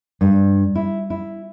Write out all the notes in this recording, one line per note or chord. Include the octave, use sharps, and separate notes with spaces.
G2
E4
E4